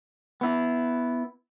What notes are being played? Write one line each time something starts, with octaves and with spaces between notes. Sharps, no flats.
B3 E4